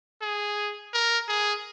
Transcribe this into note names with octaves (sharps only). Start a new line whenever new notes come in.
G#4
A#4
G#4